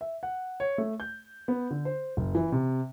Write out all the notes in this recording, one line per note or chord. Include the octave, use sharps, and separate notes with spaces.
E5
F#5
C#5
A3
G6
B3
D3
C5
F#1
E3
C3